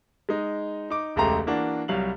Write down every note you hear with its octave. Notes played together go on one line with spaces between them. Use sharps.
G#3 D#4
D#4 D6
E1 C#2 A3 G4 A#5 C6
E3 A#3 D4 F#4
C2 F#3 G3 F5 F#7